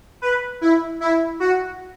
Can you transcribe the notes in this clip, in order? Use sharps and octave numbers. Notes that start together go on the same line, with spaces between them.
B4
E4
E4
F#4